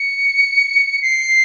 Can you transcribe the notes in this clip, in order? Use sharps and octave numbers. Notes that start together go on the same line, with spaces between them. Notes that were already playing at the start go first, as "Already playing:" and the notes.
Already playing: C#7
C7